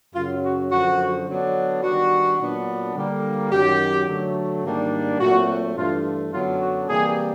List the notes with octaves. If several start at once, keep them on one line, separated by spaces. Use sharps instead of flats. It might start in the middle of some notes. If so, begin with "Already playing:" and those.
F#2 C#3 F#3 F4
F#4
F#2 D3 F3 F#4
D3 F#3 B3 D4
D#3 G3 B3 D4 F#4
A#2 F#3 B3 D4
D3 G3 A#3
F#2 D#3 F#3 G4
D3 F#3 A3
G#2 D#3 G3 A#3 D4
A#2 F#3 A3 C4 F#4
G2 E3 A3 D4 F4
F#2 D3 F#3 B3 D4 F4
F#4
C3 E3 G3 A#3 G#4